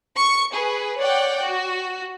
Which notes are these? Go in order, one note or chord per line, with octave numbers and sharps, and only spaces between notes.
C#6 C#7
G#4 B4
C#5 D5 F#5 G5
F#4